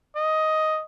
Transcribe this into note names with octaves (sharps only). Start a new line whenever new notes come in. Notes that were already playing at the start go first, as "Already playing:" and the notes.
D#5